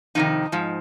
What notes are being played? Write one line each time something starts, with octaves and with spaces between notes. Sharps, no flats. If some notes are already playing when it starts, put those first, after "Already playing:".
F2 C3 D#3 D#4
G#2 F3